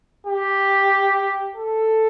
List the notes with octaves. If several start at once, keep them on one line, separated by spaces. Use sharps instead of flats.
G4
A4